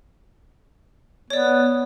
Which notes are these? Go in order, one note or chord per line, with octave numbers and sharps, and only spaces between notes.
B3 C#5 D5